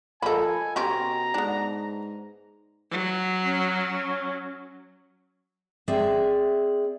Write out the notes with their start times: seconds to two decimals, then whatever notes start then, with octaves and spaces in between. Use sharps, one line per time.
0.22 F3 A#3 D#4 A4 G#5 B5
0.76 B2 C4 C#4 G4 A#5
1.34 G#2 B3 D4
2.91 F#3
3.45 C#4
5.88 C4 G#4 D5 E5